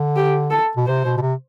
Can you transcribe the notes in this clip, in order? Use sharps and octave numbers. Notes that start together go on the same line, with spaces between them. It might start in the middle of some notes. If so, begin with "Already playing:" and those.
Already playing: D3
G4
A4
B2
C3 C5
B2
B2
C3